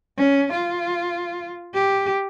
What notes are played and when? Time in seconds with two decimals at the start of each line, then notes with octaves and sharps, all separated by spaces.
0.18 C#4
0.53 F4
1.74 G4